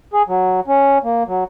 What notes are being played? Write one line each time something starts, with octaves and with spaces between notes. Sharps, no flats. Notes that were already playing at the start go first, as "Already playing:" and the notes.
G#4
F#3
C#4
A#3
F#3